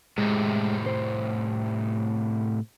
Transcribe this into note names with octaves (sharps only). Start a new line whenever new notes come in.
A2 C3 G#3
C5